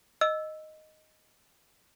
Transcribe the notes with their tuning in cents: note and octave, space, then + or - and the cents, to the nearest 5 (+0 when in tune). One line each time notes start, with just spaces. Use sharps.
D#5 +0 E6 +0